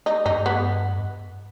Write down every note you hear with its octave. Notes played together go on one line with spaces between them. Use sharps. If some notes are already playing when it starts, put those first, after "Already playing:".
D#4
G2 D#4
B3